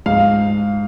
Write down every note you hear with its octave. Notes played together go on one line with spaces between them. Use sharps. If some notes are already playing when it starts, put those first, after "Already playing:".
G#2 F5